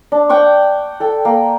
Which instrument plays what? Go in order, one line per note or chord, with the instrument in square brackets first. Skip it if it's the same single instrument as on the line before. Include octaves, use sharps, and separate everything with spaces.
[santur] D4
F#5 G5 C#6 D6
A4 G5
A#3